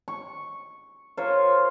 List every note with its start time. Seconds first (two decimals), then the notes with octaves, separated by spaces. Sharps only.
0.08 C#6
1.17 F4 A#4 C5 C#5